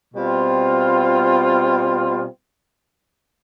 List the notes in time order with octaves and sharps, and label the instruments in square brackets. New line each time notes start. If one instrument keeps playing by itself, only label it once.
[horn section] B2 G3 C4 F4